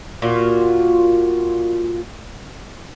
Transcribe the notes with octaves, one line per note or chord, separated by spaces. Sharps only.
A#2 F4 F#4